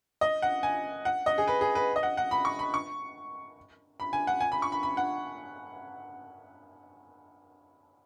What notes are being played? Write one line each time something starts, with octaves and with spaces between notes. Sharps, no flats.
D#5
F#5
G#5
F#5
D#5
G#4
B4
G#4
B4
D#5
F#5
F#5
B5
C#6
B5
C#6
B5
G#5
F#5
G#5
B5
C#6
B5
B5
F#5